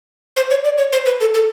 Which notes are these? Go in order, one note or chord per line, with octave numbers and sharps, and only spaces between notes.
C5
C#5
D5
C#5
C5
B4
A4
A4